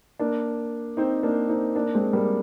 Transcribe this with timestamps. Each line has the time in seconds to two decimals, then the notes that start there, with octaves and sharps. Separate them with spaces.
0.19 A#3 D4
0.97 C4 D#4
1.23 A#3 D4
1.49 C4 D#4
1.75 A#3 D4
1.94 G#3 C4
2.13 G3 A#3